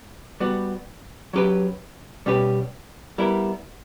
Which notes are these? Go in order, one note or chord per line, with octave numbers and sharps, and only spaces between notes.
G3 B3 F#4
F#3 C#4 G4 B4
B2 G3 C#4 G4 B4
G3 B3 E4 A#4